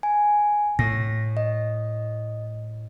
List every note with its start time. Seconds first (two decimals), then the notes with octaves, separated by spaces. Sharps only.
0.03 G#5
0.79 A2 A#6
1.37 D#5